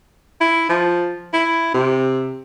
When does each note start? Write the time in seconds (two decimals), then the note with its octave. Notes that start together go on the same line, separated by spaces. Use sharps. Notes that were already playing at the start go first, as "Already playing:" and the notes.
0.41 E4
0.69 F3
1.33 E4
1.74 C3